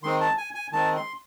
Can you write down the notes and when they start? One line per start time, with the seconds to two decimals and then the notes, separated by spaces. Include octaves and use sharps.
0.03 D#3 G#3 C4 C6
0.21 A5
0.37 G#5
0.55 G#5
0.72 D#3 G#3 C4 A5
0.96 C6